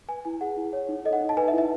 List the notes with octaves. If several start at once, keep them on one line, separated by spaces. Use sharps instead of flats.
B4 G#5
E4 G#5
G#4 F#5
E4
C#5
D#4
A4 D#5
F#5
D#4
A5
B4 G#5
E5
E4
E5